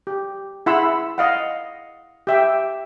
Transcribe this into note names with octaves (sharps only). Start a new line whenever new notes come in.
G4
E4 G#4 F#5 B5 C6 E6
D#5 F5 F#5
G4 E5 G5